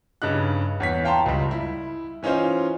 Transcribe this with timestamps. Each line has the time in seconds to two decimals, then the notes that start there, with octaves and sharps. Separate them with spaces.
0.22 G2 C#3 D#4 F#6
0.80 E2 C#5 B6
1.05 F5 G5 A5 A#5 C6
1.26 C#2 G3
1.51 E4
2.23 E3 C#4 D#4 F4 C5